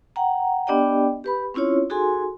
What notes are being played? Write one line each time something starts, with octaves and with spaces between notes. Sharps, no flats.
F#5 G5 A#5
B3 D4 G4 D5 D#5 G5
G4 B4 B5
C4 C#4 E4 F4 C#5
D#4 F#4 G#4 A4 G#5 C6